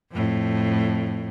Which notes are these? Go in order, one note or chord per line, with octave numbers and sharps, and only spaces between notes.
F2 A2